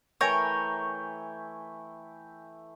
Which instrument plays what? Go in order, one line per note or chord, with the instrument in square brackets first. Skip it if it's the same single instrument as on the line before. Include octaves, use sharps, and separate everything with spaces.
[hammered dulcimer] E3 A3 E4 [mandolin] A#4 C#5 [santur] G5 G#5